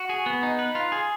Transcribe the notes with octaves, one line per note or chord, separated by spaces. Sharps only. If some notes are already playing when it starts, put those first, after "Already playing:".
Already playing: F#4
G#4
B3
D#4
B4
F4
G#4